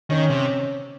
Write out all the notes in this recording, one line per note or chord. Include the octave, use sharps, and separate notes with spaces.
D#3 C#4
C3